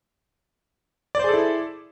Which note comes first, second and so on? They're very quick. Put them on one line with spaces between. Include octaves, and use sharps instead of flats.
D5 C5 G#4 A4 E4